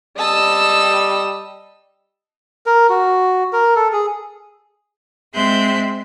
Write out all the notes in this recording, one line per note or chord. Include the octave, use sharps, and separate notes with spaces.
G3 D#5 A5 E6
A#4
F#4
A#4
A4
G#4
G#3 C4 E5 C6 F#6 G6